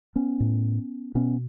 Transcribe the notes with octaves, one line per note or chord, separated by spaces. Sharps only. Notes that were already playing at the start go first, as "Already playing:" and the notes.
B3 C#4
A2
B2 B3 C#4